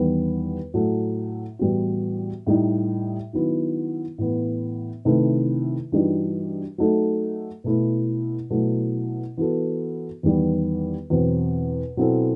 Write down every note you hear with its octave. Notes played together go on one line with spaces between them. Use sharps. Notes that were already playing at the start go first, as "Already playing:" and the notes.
Already playing: E2 D#3 G3 B3
A2 F#3 A3
A2 E3 G3 B3 F#4
A2 G3 D#4
D#3 F#3 B3 E4
A2 E3 B3
C3 D#3 A3 E4 B4
G2 E3 G3 D#4 F#4
F#3 A3 D#4 A4
B2 A3 E4 B4
B2 F#3 A3 E4
E3 B3 F#4 A4
E2 D#3 G3 B3
E2 B2 F#3 C4
B2 F#3 C4 E4 A4